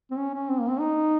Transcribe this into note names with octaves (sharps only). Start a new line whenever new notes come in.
C4
C#4
C#4
C4
A#3
C4
D#4